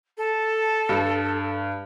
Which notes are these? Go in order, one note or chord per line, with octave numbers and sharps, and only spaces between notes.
A4
G2